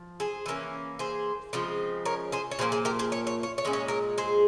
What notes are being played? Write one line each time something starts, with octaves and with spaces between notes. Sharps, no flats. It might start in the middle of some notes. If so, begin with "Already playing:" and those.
Already playing: F3
G#4 C5
E3 G3 A#3 C#4
G#4 C5
C#3 F3 G#3 C4
A#4 C#5
G#4 C5
C#5
A#2 F3 A#3 G#4 C5
G#4 C5
G4 A#4
G#4 C5
C#5
C#5
C#5
C#5
A#2 G#3 C#4
C#5
A#4 C#5
G#4 C5